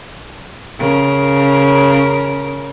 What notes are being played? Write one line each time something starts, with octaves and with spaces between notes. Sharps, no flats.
C#3 A#4